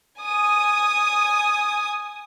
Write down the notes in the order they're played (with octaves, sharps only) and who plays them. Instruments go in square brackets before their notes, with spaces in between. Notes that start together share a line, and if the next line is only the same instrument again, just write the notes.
[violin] G#5 D#6